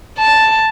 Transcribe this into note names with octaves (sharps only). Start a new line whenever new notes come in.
A5